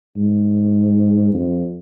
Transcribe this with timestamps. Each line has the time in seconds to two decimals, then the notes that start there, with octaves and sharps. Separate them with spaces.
0.16 G#2
1.33 F2